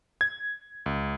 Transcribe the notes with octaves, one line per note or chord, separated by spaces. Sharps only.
G#6
C#2